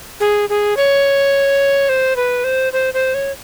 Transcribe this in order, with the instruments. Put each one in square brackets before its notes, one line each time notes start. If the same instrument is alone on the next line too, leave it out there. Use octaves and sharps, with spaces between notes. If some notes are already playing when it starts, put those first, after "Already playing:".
[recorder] G#4
G#4
C#5
C5
B4
C5
C5
C5
C#5